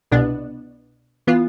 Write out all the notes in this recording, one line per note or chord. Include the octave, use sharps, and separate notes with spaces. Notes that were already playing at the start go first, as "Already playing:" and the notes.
C2 B2 B3 D4
E3 B3 F4